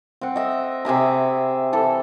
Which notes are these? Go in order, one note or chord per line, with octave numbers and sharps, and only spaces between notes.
C4 F#5
D#5 E5
C3 G#4 E5 B5
E3 A4